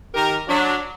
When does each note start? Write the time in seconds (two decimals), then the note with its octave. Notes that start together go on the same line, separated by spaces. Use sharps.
0.14 D#3 G4 A#4
0.48 F#3 D4